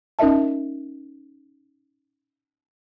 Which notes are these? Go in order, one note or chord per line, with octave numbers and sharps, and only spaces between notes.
C#4 D#4 A#4 D#5 E5 A5